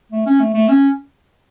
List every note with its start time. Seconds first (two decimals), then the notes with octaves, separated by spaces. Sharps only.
0.12 A3
0.26 C#4
0.40 A3
0.54 A3
0.68 C#4